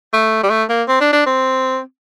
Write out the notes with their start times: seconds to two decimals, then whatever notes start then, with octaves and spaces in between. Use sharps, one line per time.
0.13 A3
0.43 G3
0.50 A3
0.69 A#3
0.88 C4
1.00 D4
1.13 D4
1.26 C4